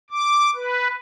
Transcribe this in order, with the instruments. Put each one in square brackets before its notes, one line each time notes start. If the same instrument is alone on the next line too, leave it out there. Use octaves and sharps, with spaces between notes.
[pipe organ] D6
B4